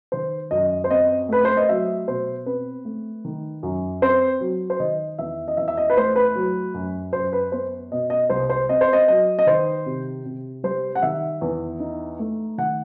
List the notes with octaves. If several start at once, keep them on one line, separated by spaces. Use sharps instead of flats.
D#3 C5
F#2 D#5
C5
C4 D#5
A3 B4
C5
D#5
F#3 E5
B2 C5
C4 B4
A3
D#3
F#2
C4 C5
F#3
C5
D#3 D#5
E2 E5
D#5
E2 E5
E5
D#5
B4
A3 C5
B4
F#3
F#2
F#2 C5
B4
B3 C5
B2 D#5
D#5
C2 C5
C5
C4 D#5
C5
D#5
F#3 D#5
D#5
D#3 C5
C3
C3
G3 C5
F#5
D#3 E5
E2
D#4
A3
D#3 F#5